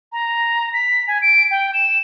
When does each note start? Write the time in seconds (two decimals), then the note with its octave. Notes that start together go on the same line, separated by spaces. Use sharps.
0.12 A#5
0.73 B6
1.08 G#5
1.22 D7
1.51 G5
1.74 E7